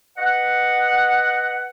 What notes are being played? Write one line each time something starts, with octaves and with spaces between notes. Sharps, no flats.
B4 D#5 F#5